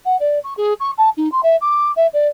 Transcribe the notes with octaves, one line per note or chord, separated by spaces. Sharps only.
F#5
D5
C#6
G#4
C#6
A5
D#4
C6
E5
D6
E5
D5